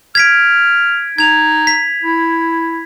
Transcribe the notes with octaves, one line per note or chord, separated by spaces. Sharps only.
F6 G#6 B6 D7
D#4 G#6 F7
B6
E4